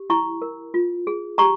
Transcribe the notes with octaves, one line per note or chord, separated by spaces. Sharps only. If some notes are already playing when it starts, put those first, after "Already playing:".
Already playing: G4
E4 A#5 C#6
A#4
F4
G#4
G4 A#5 C#6